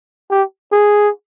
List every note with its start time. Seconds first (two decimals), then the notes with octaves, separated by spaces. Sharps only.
0.30 G4
0.72 G#4